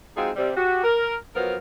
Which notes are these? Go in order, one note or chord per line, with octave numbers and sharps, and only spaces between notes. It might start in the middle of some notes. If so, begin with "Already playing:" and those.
G#3 C4 D#4 F4 F#4 G#4
C3 G3 C4
F#4 G4
A#4
F3 F#3 B3 A#4 C#5 F5